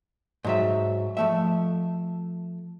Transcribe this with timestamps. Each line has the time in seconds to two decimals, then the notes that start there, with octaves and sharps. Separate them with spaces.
0.44 G#2 F#3 E5
1.17 F3 A3 E5